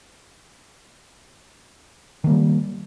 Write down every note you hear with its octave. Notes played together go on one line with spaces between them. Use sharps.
D#3 G3 A#3